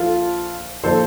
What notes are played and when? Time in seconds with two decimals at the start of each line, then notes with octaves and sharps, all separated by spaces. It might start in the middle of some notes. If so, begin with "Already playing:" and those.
Already playing: A#1 A#2 F3 F4 A4
0.84 A#2 F3 A4 C5